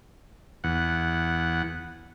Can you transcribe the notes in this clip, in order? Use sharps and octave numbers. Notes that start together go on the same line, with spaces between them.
E2 F#5